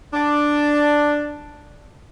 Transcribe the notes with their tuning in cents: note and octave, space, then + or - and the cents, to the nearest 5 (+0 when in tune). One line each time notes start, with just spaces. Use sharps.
D4 +5